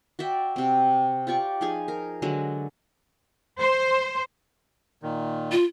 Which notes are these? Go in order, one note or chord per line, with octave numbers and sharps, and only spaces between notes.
F#4 D5 E5 G5
C3 C4
F4 G4 D5 C#6
F3 D#4 G#4 G#5
A#4
D3 F#3 G#3
C5
A#2 D#3
F4